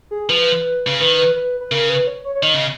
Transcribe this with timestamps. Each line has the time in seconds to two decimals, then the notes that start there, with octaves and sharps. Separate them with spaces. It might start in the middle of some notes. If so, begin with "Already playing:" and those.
0.11 G#4
0.29 F3 B4
0.87 C#3
1.00 D#3 B4
1.35 B4
1.60 B4
1.72 C#3 A#4
1.89 B4
2.07 C#5
2.25 C#5
2.35 C#5
2.43 D#3 D#5
2.54 C#3